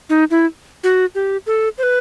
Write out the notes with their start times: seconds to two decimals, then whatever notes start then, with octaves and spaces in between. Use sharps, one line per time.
0.10 D#4
0.31 E4
0.84 F#4
1.15 G4
1.47 A4
1.78 C5
1.83 B4